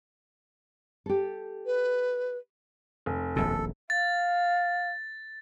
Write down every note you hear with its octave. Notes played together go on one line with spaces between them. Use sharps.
G4 A4
B4
F1
D#1 A#1 B2 A4
F5 A6